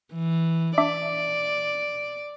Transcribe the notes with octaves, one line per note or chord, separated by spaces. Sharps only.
E3
D4 D5 E5 D6